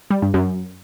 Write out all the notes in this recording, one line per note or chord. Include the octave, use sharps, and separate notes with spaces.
G3
G2
F#2